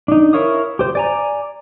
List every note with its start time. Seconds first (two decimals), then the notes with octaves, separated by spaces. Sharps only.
0.08 D4 D#4
0.33 E4 A#4 C#5 F5 D#6
0.79 G4 C5
0.95 D5 G#5 A#5